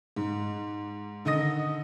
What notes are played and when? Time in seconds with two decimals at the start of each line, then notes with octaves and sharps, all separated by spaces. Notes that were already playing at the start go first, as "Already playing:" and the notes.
0.16 G#2
1.25 D3 D#3 D#5 D#6 A#6